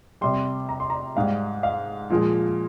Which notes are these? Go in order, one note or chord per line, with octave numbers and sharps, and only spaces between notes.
C3 G3 C6
A#5
C6
A#5
G#2 G3 F5
F5
A#2 F3 G#3